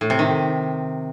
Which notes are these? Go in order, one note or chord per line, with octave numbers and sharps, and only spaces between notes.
A2
C3
D#3